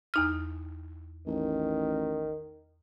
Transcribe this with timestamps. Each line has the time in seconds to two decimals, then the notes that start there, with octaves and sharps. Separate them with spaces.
0.14 E2 D#4 F6
1.27 A1 D#3